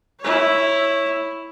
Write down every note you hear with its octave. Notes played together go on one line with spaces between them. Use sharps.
E4 C#5